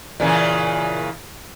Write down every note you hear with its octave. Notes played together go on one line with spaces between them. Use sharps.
A#2 C#3 E3